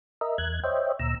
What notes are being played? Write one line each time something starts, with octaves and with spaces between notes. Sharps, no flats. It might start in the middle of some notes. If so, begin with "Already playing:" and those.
A#4 D#5 E5
E2 F#6 G#6
C5 C#5 D#5 E5 G5
D2 A#2 A#5 E6